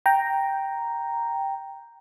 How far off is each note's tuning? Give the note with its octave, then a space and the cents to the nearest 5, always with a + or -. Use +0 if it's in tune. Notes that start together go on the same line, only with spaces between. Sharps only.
G5 +0 A#5 +0